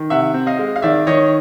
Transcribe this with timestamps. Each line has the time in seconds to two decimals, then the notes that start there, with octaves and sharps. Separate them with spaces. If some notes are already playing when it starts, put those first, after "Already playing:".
Already playing: D#3
0.10 C3 E5 F#5
0.34 C4
0.46 D#5 F5
0.59 G#3
0.76 F5
0.82 D#3 D5 E5
1.07 D#3 C#5 D#5